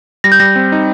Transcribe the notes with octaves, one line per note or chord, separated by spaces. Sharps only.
G3 A#6
G6
G3 A#6
C4
D#4